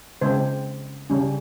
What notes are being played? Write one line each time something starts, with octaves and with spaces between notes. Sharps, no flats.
C#3 G#3 C4 C5
C#3 G3 C#4